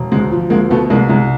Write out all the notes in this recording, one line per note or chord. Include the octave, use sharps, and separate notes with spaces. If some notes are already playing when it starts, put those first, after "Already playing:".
Already playing: E1
D2 G#3
F3
D2 G#3 A#3
B2 A3 B3
C2 G#3 A#3
C2 G#3